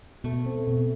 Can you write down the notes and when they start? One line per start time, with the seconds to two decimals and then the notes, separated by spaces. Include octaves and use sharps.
0.24 B2 A3
0.46 C4
0.67 B2